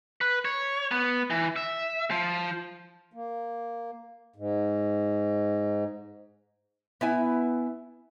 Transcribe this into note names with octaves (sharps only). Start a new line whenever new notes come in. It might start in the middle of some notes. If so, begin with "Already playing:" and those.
B4
C#5
B3
E3
E5
F3
A#3
G#2
B3 E4 G#5